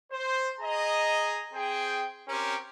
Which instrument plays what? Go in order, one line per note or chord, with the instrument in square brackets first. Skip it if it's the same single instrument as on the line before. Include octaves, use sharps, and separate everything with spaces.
[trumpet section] C5
G#4 D#5 A#5
C4 G#4 G5
C4 C#4 G4 A#4